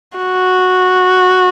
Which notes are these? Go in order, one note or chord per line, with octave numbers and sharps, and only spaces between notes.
F#4